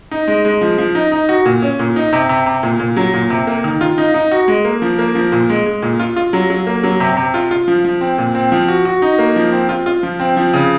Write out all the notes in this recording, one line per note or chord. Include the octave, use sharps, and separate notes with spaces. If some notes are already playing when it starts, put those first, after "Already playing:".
D#4
G#3
G#3
F3
F3
D#4
D#4
F#4
A#2
C#4
A#2
D#4
C3
C3
C3
A#2
A#2
F#3
A#2
C3
A#3
D#3
F4
D#4
D#4
F#4
G#3
A#3
F3
A#3
F3
A#2
G#3
G#3
A#2
F4
F4
F#3
F#3
A#3
F#3
C3
C3
F4
F4
F3
F3
C4
A#2
C4
F3
F#4
F#4
D#4
A#3
F3
C4
F4
F4
F3
C4
F3
C#3